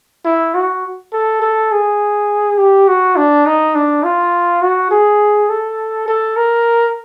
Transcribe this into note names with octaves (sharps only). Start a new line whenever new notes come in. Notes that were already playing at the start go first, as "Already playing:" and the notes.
E4
F#4
A4
A4
G#4
G4
F#4
D4
D#4
D4
F4
F#4
G#4
A4
A4
A#4